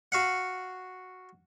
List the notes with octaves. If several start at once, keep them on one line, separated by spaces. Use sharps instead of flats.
F#4 F5 F#5